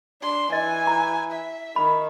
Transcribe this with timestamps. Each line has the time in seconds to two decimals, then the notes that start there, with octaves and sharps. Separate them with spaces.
0.22 D4 C6
0.52 E3 D#5 G#5
0.87 A#5
1.31 E5
1.76 D#3 B5